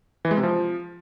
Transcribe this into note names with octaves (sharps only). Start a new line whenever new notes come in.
E3
G#3
C3
F3